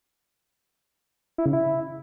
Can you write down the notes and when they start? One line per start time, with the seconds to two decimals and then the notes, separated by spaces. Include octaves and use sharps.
1.38 E4
1.46 C#3
1.53 E4